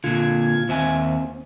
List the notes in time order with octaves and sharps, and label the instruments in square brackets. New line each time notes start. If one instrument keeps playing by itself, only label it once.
[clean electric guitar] A#2 D3 [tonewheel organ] F4 G#6
[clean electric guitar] D#2 E5 G#5 [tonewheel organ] C4